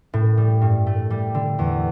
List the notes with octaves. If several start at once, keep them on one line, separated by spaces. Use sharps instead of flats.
A2
G3
G2
A3
G3
D3
E2